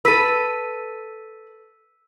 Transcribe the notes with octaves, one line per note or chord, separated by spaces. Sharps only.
A4 B4 E6 B6 D#7